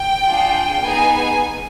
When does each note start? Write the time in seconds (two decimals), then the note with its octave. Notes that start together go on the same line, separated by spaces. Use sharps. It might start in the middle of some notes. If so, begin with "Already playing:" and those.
Already playing: G5
0.25 D4 F4 G#4
0.83 B3 D#4 G#4 G#5